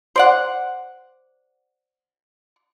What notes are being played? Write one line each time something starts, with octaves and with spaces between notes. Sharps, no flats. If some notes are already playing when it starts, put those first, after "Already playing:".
C5 D5 F#5